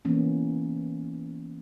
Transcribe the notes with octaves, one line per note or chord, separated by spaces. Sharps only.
E3 A#3 B3 C#4